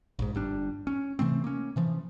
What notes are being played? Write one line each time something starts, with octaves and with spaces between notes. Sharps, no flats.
A#1 G#2
G1 G3 D4
C#4
C3 E3 A3 C4
A#3 C#4
C3 E3 F3